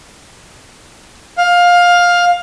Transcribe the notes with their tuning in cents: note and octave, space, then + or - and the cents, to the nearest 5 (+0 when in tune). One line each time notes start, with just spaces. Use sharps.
F5 +15